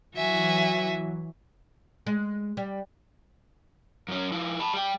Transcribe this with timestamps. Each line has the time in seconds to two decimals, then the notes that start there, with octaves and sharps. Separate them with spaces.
0.16 E3 F#3 F#4 E5 G#5
2.07 G#3
2.57 G3
4.09 F#2 C#4
4.32 F3 E4
4.60 A5 B5
4.73 G3 G5